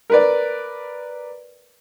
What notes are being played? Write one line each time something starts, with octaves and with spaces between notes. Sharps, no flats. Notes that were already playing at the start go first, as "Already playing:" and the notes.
A#4 B4 D5